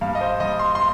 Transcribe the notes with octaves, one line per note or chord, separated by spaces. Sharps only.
G2 F5
D#5
C5
G2 D#5
C6
C6